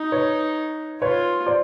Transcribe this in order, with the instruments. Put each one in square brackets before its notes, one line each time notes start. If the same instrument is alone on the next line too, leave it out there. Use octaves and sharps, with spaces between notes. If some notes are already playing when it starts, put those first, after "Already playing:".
Already playing: [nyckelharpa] D#4
[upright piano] B4 C#5
[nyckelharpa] F4 [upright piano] B4 C#5
[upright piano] C5 D5